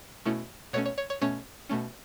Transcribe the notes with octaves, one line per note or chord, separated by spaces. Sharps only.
B2 A3 C#4 E4
B2 A3 C#4 C#5
C#5
C#5
C#5
B2 A3 C#4 C#5
B2 A3 C#4